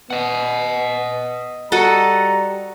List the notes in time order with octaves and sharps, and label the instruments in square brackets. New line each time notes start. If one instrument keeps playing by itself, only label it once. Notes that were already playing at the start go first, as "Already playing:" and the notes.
[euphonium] B3 [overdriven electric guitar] D#5 F#5
[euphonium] G3 [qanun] F#4 A4 D#5 [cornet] A#5